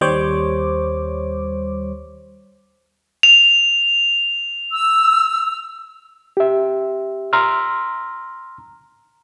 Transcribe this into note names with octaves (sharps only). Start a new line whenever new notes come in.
D#2 G3 C5 C#5 D6
F7
E6
G4 E5
A#5 C6 E6 F6